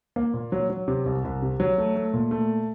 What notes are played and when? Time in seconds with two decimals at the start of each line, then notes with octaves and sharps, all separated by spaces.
0.16 A#3
0.34 A#2
0.52 F#3
0.69 F#3
0.88 C3
1.06 C2
1.24 C2
1.42 C3
1.60 F#3
1.78 A3
1.96 A3
2.14 A#2
2.31 A3